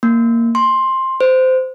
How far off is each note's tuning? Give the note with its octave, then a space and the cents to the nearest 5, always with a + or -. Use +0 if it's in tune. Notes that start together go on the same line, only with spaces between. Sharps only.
A#3 -10
C6 +10
C5 -20